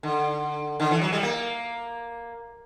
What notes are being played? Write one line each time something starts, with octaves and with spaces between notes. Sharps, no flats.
D3
D3
E3
F#3
G3
A#3